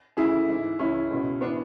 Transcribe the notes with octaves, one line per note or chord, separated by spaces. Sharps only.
D2 C#3 E3 E4 G#4
G#2 E3
C#2 C#3 E3 C#4 E4
C#2 B2
E3 B3 D4